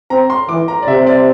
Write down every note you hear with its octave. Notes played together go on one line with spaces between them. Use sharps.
C4 A#5
C6
E3 D6
A#5
D5
C3 E5
D5